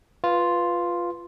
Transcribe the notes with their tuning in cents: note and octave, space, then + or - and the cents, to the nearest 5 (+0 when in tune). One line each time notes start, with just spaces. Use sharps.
F4 +0 B4 +0